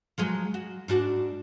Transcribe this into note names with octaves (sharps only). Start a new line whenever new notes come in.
F3 F#3 G#3
F#4
G#2 D4 F#4